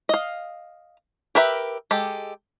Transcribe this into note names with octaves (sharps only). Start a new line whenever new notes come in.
D#5 F5
G4 A#4 B4 E5
G#3 G4 A4